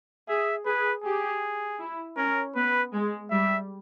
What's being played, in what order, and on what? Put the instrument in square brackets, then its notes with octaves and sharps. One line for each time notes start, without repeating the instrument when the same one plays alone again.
[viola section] G#4 [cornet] E5
[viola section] G#4 [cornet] B4
[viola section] G4 [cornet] G#4
[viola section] E4
[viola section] C#4 [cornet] A#4
[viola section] B3 [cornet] B4
[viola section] G#3
[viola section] G3 [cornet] E5